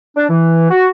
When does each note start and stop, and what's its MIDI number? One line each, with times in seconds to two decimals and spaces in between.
0.17 0.25 62
0.29 0.67 52
0.70 0.87 66